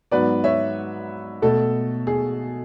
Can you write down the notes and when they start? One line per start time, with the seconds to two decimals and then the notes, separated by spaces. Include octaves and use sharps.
0.12 G#2 F#3 B3 B4 D5
0.44 C#5 E5
1.42 B2 A3 A4
2.07 G#4